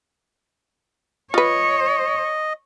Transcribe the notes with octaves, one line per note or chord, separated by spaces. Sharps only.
F4 B4 C#5 D#5